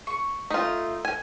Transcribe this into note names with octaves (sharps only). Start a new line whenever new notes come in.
C#6
A3 D#4 F4
G#5